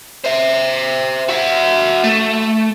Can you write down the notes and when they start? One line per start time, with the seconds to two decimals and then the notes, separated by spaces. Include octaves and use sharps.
0.24 C5 E5
1.29 F#4 E5
2.04 A3